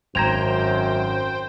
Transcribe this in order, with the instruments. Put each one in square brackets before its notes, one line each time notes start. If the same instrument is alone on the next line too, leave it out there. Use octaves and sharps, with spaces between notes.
[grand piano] G#1 A#6 [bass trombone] F#2 [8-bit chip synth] C5 G5 [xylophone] A#5 G#6 F7